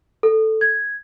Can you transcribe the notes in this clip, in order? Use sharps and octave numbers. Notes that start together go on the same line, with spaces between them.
A4
G#6